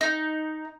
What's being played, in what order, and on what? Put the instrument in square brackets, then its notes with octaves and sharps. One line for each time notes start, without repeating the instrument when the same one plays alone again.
[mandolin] D#4